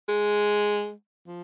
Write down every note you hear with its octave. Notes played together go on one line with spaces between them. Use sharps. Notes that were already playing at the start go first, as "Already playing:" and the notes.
G#3
F3